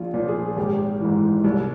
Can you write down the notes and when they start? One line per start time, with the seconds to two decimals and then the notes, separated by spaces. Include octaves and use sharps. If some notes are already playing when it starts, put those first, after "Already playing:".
Already playing: A#1 F4
0.14 A#2 F3
0.28 G#4
0.56 G#1 G4
1.00 G#2 E3
1.44 C2